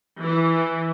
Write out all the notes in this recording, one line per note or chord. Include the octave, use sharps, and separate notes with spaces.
E3